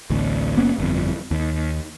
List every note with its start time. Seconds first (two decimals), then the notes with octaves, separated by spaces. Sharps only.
0.10 A1 D2
0.56 F#1 A#3 B3 C#4
0.78 G1 F2
1.31 D#2